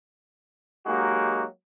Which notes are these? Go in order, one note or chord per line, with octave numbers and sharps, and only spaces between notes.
F#3 G#3 A#3 D#4 F#4 G4